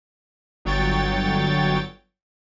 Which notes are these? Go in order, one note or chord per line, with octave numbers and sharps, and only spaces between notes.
G1 F#3 C#5 G5 A6